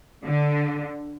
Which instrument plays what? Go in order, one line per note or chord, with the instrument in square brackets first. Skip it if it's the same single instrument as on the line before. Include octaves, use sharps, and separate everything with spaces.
[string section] D3